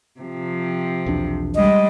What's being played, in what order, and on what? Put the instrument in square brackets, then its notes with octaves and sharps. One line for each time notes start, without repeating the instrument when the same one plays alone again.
[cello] C3 F3
[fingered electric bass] B1 E2 D4
[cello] G3 G#3 [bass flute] D#5